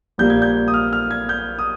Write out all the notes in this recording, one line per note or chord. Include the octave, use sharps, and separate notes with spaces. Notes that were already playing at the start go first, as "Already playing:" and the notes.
A#1 A#2 G3 A#3 G6
G#6
G6
D#6
F6
F6
G#6
G6
D#6